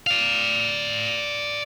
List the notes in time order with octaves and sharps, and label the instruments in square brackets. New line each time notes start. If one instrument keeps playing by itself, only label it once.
[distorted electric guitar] D5 F5